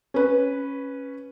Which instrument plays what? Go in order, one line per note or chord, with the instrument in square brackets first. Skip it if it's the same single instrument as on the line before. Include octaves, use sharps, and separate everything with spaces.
[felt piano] C#4 B4